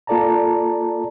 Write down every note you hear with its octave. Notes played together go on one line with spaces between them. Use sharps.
A#3 F4 A4 D5 A5 A#5